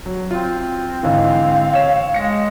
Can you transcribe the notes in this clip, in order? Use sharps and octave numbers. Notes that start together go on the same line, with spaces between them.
F#3
C4 F4
G#2 D3 E3 F5
C#5 E7
G#3 A#6 C#7